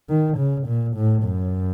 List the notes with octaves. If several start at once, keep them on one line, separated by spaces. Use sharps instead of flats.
D#3
C#3
A#2
A2
F#2